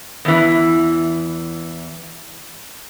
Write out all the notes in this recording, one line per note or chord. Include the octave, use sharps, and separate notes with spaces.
E2 E3